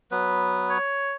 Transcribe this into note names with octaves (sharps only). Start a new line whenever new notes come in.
F#3 B3 B4
C#5